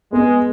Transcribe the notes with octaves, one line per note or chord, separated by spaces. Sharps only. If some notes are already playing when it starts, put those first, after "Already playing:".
G#3 B3